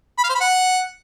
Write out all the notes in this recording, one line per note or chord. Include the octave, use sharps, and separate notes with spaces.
B5
F5
C5
B5
F#5